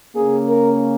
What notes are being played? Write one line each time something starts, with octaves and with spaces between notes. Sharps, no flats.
C#3 A#3 C#4 G#4
A#4